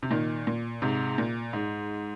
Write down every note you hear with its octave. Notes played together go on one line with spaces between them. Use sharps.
C3
A#2 D#3
A#2
G#2 C3
A#2
G#2